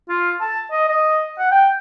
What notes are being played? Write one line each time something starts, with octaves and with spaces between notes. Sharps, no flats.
F4
A5
D#5
D#5
F#5
G5